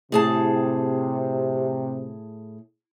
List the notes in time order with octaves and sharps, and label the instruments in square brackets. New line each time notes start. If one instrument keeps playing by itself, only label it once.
[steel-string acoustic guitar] A2 G#4 A5 [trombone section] C3